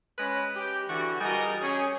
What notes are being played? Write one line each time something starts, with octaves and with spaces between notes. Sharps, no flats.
G#3 C#4 B4 B5
G4
D3 E3 F#4
G3 F#4 G#4 A#4 D#5
C#4 G#4